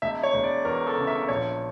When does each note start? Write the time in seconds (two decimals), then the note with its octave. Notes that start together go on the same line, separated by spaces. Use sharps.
0.02 E1 E5
0.23 C#5
0.34 E1
0.44 D5
0.65 E2 A#4
0.87 A4
0.97 C#3
1.07 E5
1.28 A#1 C#5